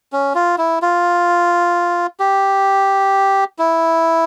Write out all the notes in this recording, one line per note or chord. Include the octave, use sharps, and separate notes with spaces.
C#4
F4
E4
F4
G4
E4